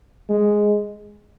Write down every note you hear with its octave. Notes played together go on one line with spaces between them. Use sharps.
G#3